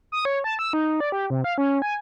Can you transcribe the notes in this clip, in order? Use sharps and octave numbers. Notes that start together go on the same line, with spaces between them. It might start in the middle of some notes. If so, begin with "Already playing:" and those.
D#6
C#5
A5
E6
D#4
D5
G4
C3
F5
C#4
G#5